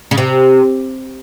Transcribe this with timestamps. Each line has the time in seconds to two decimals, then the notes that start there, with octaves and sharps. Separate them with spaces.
0.11 C#3
0.18 C3